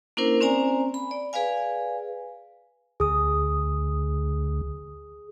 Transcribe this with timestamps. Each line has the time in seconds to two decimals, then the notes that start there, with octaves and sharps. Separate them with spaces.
0.17 A#3 C#4 D4 E4 A#4 C5
0.41 C4 C#4 C5 D5 G#5 A#5
0.94 B5
1.11 D5
1.33 G#4 B4 D5 F5 G#5
3.00 D2 G#4 D#6